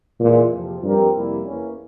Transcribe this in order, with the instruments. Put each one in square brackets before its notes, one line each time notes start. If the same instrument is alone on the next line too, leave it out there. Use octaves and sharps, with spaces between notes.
[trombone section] E2 E3 G#3 [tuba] A#2
[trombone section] F2 C3 F3
[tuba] G2 [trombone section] F3 C4 G4 A#4
[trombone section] F2 C3 G3 A#3 E4
E2 E3 A#3 C#4